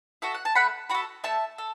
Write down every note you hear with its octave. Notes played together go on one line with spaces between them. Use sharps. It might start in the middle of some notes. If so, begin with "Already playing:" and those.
F#4 A4 E5
F#5
A5
A3 F#5 B5
F#4 A4 F#5 B5
A3 E5 A5
A4